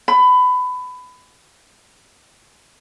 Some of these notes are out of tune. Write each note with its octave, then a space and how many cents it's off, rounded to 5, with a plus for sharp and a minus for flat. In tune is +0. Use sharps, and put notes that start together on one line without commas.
B5 +20